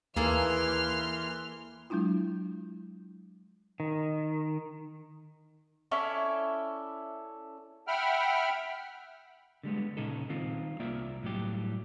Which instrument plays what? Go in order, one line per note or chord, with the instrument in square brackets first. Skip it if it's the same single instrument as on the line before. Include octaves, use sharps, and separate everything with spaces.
[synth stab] D#2 [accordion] E3 [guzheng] A#3 G#4 A4 [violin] C6 F6
[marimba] F#3 G#3 D4 E4 F4
[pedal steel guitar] D#3
[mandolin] C#4 E4 A4 D5
[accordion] E5 F#5 G5 B5 F6
[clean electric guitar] D3 G3 G#3 B3
A#2 C#3 D#4 A4
D#3 C4 F4
C2 A#3 F4 D5 E5
A2 F#3 G3 G4